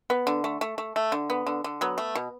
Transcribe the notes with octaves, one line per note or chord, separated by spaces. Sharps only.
B3
D3
A3
A3
A3
A3
D3
B3
D3
D3
F#3 B3
A3
B2